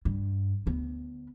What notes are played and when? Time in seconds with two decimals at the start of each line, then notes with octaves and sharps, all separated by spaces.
0.05 G2
0.66 D2 B3